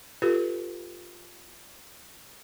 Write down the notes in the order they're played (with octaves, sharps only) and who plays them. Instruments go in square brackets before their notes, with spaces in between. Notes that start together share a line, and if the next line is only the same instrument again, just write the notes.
[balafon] F4 G4 A4 B4